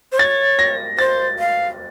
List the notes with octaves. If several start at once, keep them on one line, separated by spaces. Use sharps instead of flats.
C5
C#5 A6
A#6
C5 A6
F5